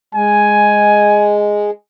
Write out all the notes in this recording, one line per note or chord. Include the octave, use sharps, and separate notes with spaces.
G#3 G#5